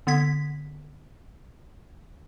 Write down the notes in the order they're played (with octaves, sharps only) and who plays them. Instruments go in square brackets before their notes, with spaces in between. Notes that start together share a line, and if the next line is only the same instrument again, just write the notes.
[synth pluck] D3 B3 G#6 B6